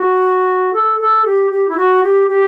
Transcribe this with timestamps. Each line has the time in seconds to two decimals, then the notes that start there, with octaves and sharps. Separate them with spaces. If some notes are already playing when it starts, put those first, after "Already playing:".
Already playing: F#4
0.73 A4
1.00 A4
1.25 G4
1.51 G4
1.69 E4
1.77 F#4
2.04 G4
2.29 G4